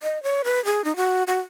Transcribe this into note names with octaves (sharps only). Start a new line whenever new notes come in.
D#5
C#5
B4
G#4
D#4
F#4
F#4